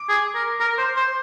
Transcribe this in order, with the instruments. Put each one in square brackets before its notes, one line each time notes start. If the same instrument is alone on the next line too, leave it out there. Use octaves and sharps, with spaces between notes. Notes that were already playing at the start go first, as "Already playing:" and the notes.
Already playing: [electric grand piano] D6
[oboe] G#4
A#4
A#4
C5
C5